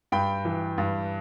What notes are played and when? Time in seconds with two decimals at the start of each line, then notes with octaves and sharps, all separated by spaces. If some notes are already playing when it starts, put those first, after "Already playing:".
0.12 G2 G5 B5
0.45 E3
0.78 G2